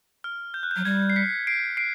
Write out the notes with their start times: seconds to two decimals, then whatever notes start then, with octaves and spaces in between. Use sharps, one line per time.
0.24 F6
0.54 G6
0.63 F#6
0.71 G6
0.76 F#3
0.85 G3 G#6
1.10 C7
1.16 B6 C#7
1.47 C7 D7
1.77 C7 D7